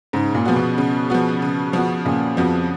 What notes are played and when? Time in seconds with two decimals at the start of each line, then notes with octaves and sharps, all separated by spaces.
0.13 G#2 C#3
0.35 A#2
0.45 F3 B3 F#4
0.56 B2
0.78 C#3
1.10 F3 B3 F#4
1.42 C#3
1.73 F3 B3 F#4
2.05 A#2 C#3
2.37 F2 F3 B3 F#4